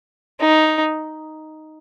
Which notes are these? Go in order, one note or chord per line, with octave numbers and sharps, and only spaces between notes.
D#4